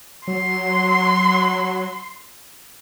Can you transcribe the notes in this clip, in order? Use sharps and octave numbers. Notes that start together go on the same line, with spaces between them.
F#3 C6